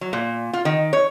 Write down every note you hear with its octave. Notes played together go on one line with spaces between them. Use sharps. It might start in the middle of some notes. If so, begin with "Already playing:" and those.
F#3
A#2
F4
D#3
C#5